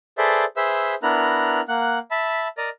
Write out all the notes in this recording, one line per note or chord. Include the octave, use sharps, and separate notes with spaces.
G#4 A4 B4 C5 D5 E5
G#4 B4 C5 E5 E6
B3 D4 E4 A#4 A#5 F#6
A#3 F#5 F#6
E5 A5 B5
A#4 D5 D#5 A#5